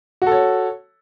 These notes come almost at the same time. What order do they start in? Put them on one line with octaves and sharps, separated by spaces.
F#4 A4 C#5